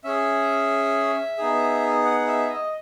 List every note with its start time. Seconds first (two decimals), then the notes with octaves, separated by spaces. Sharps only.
0.04 C#4 G#4 E5
1.38 B3 D#4 G#4
2.05 F#5
2.27 E5
2.49 D#5